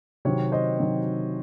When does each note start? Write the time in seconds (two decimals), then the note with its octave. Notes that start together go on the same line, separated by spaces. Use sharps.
0.25 C3 D#3 F#3 C4 C#5
0.52 C5 D#5
0.79 C3 D#3 F#3 C4